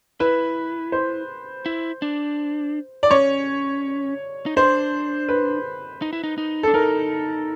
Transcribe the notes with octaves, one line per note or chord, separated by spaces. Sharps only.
E4 B4
C5
E4
D4
D5
C#4 C#5
D#4
D4 C5
B4
D#4
E4
D#4
D#4
D4 A4
D#4 A#4